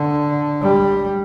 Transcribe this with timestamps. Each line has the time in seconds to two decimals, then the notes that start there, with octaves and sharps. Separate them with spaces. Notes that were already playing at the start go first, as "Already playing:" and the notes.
Already playing: D3
0.61 G3